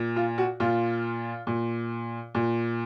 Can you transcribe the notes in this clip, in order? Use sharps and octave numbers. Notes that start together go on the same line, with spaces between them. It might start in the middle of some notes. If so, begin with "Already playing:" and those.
Already playing: A#2
F4
F#4
A#2 F4
A#2
A#2